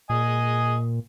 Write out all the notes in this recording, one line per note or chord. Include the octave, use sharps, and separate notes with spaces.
A#2 D#5 G#5